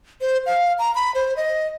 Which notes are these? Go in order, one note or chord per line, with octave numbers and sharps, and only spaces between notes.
C5
F5
A#5
B5
C5
D#5